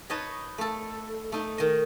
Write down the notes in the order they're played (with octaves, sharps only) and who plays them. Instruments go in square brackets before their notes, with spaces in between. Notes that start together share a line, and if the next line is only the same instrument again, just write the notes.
[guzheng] D#4 B4 C#5 D#5 A5
A3 A4
A3 D#4
D#3 D#5